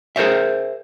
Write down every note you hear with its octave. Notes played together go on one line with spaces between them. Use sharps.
G#4 A#4 C5 C#5 E5